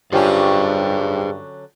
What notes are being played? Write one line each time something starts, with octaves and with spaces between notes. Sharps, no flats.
G2 D3 F#3 C#4 F4 G4 G#4 C5